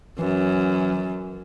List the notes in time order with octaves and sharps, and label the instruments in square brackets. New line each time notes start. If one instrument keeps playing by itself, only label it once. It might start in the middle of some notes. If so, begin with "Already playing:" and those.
[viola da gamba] F#2 [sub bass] E3